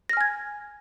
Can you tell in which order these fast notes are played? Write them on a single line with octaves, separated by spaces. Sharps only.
A#6 F6 G#5 G#6